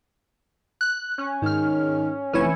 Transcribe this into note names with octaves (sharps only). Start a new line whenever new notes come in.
F#6
C#4
G#2 D#3 F6
F1 E3 C#4 E4 C#5